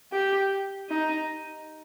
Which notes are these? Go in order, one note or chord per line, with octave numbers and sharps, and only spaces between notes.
G4
D#4